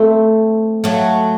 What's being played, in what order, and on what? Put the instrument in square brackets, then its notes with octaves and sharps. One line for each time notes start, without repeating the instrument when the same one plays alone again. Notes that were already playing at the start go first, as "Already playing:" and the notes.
Already playing: [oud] A3 C4
F#3 A3